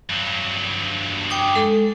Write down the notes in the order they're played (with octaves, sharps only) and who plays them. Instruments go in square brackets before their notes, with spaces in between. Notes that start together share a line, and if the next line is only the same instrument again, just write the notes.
[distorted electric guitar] G2 F#3
[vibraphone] G5 D6 D#6
G#3 A4